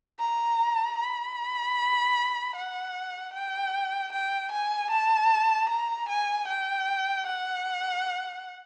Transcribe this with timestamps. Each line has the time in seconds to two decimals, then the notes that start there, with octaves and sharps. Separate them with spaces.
0.20 A#5
0.99 B5
2.56 F#5
3.34 G5
4.13 G5
4.52 G#5
4.91 A5
5.70 A#5
6.09 G#5
6.48 G5
7.27 F#5